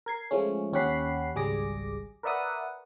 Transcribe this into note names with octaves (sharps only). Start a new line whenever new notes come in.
A#4 G#6 C7
F3 G#3 A3 C#4
D#2 C#4 G4 F#5 B5 C7
G#1 C#2 G3 G#4 D6 A#6
A#4 B4 D5 E5 F#5 D#6